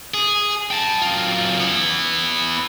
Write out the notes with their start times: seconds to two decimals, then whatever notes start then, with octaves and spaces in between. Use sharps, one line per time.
0.14 G#4
0.71 G5 A5
1.02 F#2 F4
1.60 B3 E4